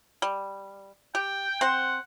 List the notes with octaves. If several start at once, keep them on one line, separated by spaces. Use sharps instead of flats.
G3
G4 G5
C4 C5 F#5